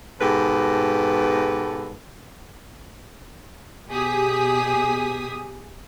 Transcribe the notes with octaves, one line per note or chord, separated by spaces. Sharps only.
G#2 B2 G4 A4 B4
B2 G4 G#4 G#5 D#6 B6